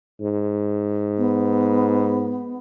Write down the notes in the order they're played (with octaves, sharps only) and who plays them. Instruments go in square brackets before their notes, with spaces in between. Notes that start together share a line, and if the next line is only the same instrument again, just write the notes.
[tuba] G#2
[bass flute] B3